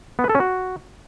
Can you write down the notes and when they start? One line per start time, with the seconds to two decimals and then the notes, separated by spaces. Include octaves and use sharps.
0.19 B3
0.24 B4
0.29 A4
0.35 C#4
0.40 F#4